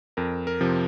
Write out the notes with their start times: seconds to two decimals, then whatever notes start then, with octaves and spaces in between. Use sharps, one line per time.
0.17 F2 A#4
0.47 A#4
0.61 C3 F3